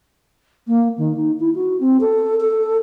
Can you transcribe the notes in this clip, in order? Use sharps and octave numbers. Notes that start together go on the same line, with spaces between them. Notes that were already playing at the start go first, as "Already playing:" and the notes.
A#3
D#3
D#4
E4
F#4
C4
A4
A4